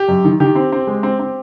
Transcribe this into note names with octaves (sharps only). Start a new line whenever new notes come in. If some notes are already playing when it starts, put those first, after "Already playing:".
Already playing: G4
F#2
D#3
D#3 G4
C4
C4
G#3
C4
C4